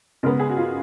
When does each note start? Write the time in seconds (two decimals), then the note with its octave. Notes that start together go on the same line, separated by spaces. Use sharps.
0.23 C#3 G#3 B3 A#4
0.40 G#4
0.50 F#4
0.57 F4